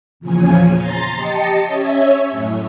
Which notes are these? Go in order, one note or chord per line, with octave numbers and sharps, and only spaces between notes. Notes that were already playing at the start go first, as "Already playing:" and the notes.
E2 A#2 C#3 F3 C#4 G#5
A#5 C6 A6
G4 D#5 A5 C#7
C#4 C#5 E5
F#2 A2